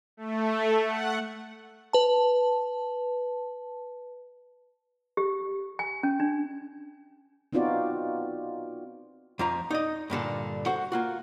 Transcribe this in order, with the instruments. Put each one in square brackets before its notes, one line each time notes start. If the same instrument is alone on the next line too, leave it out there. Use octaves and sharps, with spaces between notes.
[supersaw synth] A3
F#5
[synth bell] B4 A5
[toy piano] G4
G#5
C#4
D4
[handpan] B3 C4 D#4 F4 F#4 D5
[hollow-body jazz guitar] F2 F3 A#5
D#4 D5 D#5
G2 A#2 D3 A4
F#4 A4 C5 F#5
A#3 F4 F#4